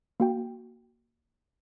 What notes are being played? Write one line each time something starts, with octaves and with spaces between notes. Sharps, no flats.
A#3 F#4 G5